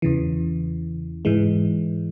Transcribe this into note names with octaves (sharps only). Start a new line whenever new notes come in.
E2 C#3 E3
G#2 E3 G#3